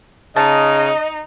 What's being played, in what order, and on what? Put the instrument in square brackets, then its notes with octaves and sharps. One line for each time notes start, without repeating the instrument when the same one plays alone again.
[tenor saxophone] C#3 [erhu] D#4 [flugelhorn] D#5 [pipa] A5